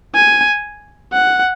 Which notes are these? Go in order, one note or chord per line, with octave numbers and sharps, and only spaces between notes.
G#5
F#5